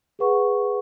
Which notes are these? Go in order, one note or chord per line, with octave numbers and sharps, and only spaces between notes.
G#4 B4 F#5 C#6